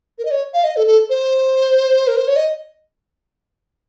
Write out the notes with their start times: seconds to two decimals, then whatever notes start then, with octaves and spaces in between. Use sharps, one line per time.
0.19 A#4
0.25 D#5
0.31 C#5
0.54 F5
0.64 D#5
0.77 A4
0.87 A4
1.10 C5
2.07 A#4
2.17 C5
2.28 C#5
2.36 D#5